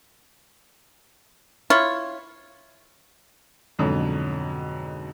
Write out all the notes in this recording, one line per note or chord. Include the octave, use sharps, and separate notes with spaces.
E4 F4 C#5
F2 G#2 B2 D3 F#3